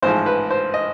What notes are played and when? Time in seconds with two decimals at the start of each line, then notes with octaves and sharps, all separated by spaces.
0.02 A1 G#2 F3 C5
0.26 B4
0.51 C5
0.74 D#5